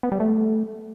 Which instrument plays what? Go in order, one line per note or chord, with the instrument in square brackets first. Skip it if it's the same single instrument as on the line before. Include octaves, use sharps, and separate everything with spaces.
[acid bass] B3
G3
A3